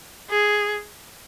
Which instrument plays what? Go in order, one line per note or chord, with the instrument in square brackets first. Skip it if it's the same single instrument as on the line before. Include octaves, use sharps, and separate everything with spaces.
[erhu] G#4